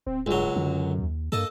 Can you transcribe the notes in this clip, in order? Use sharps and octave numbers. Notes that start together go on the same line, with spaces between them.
D1 C4
C#2 G2 F#3
F#2 D3
D#2
G2 A#3 A4 D#5